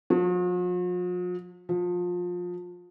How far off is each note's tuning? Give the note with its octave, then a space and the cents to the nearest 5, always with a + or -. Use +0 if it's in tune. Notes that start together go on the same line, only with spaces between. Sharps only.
F3 +45
F3 +25